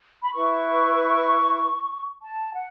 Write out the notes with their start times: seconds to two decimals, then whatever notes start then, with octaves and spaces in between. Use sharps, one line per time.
0.23 B5
0.33 E4 B4 C#6
2.22 A5
2.54 F#5